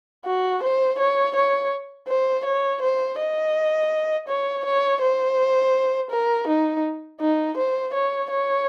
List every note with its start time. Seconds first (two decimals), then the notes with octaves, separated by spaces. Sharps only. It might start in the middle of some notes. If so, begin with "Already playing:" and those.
0.25 F#4
0.63 C5
0.99 C#5
1.35 C#5
2.08 C5
2.45 C#5
2.82 C5
3.18 D#5
4.28 C#5
4.65 C#5
5.01 C5
6.10 A#4
6.48 D#4
7.20 D#4
7.57 C5
7.94 C#5
8.30 C#5